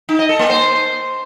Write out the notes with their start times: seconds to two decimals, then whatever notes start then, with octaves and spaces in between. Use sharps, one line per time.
0.09 D#4
0.19 D#5
0.29 A4
0.39 A#3
0.50 C5